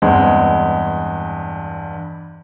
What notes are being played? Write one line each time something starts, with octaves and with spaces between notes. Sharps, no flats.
E2 G2 G#3 C4